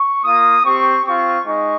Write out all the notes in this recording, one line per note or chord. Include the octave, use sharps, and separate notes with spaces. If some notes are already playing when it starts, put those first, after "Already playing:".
Already playing: C#6
A#3 F4 D#6
C4 G4 C#6
C4 F4 C#6
G#3 D#4 C#6